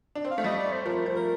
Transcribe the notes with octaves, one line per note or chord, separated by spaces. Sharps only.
D4
C4
F5
A3
G3 D#5
D5
C5
F3 A#4
F3
A#4